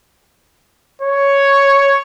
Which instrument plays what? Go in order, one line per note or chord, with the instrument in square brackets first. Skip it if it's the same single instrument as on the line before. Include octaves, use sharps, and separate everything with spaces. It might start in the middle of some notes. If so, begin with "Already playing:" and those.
[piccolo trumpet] C#5